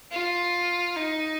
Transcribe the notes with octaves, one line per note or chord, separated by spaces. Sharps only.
F4
D#4